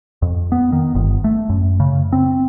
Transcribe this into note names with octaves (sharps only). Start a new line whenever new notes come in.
F2
B3
D#3
G1
A3
F#2
C#3
C4